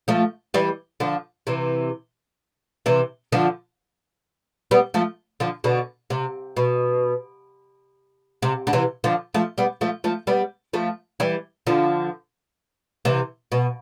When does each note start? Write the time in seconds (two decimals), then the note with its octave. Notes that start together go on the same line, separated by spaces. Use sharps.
0.08 F3 A3
0.54 E3 G3
1.00 D3 F3
1.47 C3 E3
2.86 C3 E3
3.32 D3 F3
4.71 G3 B3
4.94 F3 A3
5.40 D3 F3
5.64 B2 D3
6.10 C3
6.57 B2
8.42 C3
8.67 D3
8.73 C3 E3
9.04 D3 F3
9.34 F3 A3
9.58 G3 B3
9.81 F3 A3
10.04 F3 A3
10.27 G3 B3
10.73 F3 A3
11.20 E3 G3
11.67 D3 F3
13.05 C3 E3
13.52 B2